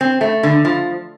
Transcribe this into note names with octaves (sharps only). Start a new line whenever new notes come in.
C4
A3
D3
F3